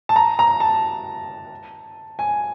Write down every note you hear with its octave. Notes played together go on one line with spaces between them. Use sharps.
A5
A#5
A#5
A5
G#5